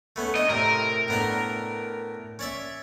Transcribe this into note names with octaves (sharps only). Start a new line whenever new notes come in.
A3 B3 C#4
D4 D#5
A2 C3 A#4
A2 B3 D4
C#4 D5 E5